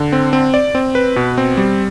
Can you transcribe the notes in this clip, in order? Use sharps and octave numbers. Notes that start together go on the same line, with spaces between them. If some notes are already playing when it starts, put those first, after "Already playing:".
Already playing: D3
C4
C4
D5
C4
B4
B2
C4
G3